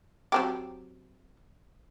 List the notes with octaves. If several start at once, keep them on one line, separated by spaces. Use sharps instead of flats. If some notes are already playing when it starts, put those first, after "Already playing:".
F#3 C4 G4